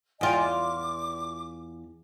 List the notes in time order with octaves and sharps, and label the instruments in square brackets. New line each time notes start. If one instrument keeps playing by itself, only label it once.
[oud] E2 F4 [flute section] D#5 G5 G#5
[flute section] D6